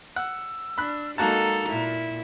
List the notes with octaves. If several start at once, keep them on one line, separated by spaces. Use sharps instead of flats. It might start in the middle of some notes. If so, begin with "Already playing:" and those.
F#5 E6
D4 B5 F#6
G#3 A#3 D#4 F#4 A4 A5 A#5
A#2 E4